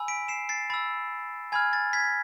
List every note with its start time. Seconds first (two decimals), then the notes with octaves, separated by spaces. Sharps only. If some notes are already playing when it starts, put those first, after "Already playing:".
Already playing: G#5 B5 E6
0.08 B6 D7
0.28 C7 E7
0.49 A6 C7
0.70 B5 E6 A6
1.52 G#5 B5 F6 G#6
1.73 A6
1.93 G#6 B6